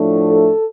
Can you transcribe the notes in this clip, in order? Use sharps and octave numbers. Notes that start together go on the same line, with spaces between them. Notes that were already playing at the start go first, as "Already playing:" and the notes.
Already playing: A2 F3 A3 D4
A4